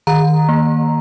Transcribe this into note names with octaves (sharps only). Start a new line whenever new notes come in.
D#3 A#5
A#3